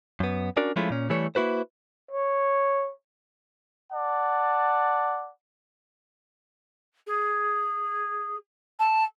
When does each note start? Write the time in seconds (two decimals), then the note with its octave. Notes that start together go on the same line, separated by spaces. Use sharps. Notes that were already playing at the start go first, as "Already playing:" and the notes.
0.20 F#2 B3
0.57 C#4 D4 F#4 A#4 D5
0.76 F3 G#3 A3 C#4 E4 F4
0.90 A#2 C#4
1.10 E3 G3 A3 A4 C#5
1.35 A#3 E4 F#4 B4 C5
2.11 C#5
3.93 D5 F#5 A5
7.07 G#4
8.79 A5